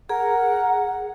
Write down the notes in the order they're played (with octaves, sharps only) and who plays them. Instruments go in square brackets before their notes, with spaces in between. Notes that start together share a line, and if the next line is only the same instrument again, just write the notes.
[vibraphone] G#4 [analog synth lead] A#4 [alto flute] F#5